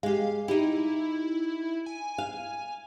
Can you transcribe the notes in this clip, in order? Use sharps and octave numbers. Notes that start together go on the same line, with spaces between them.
G#3 G4 F5
D#4 E4 G4
G#5
F5